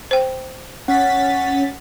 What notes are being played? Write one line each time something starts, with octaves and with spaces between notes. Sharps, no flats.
C5 G5
C#4 F#5 A6 B6